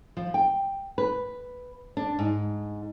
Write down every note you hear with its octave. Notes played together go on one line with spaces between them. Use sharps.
F3
G5
B4
D4
G#2